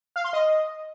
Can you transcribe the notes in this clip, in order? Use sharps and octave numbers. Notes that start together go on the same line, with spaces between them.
F5
C6
D#5